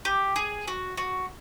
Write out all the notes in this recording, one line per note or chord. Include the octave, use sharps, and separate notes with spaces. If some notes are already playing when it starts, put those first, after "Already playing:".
G4
G#4
F#4
F#4